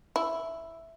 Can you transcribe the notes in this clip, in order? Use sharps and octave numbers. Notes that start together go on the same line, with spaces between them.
E4